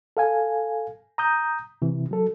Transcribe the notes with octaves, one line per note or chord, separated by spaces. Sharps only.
A4 F5 G#5
A#5 D#6 G6
C3 E3
F#3 A4